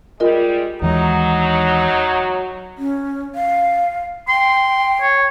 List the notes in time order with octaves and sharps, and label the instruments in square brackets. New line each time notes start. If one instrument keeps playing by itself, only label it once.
[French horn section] G3 G#3 [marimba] F4 A#4 D#5
[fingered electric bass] D#2 E3 G#3 [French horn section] F#3 [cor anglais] D#4
[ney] C#4
F5
[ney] G5 [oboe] C6
[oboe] C#5